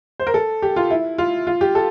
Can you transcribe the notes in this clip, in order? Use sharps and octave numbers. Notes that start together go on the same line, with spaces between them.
C5
A#4
A4
G4
F4
E4
F4
F4
G4
A4